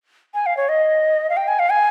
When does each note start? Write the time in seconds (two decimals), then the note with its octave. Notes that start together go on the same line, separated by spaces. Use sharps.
0.34 G#5
0.46 F5
0.57 C#5
0.69 D#5
1.29 F5
1.37 G5
1.48 G#5
1.59 F5
1.71 G#5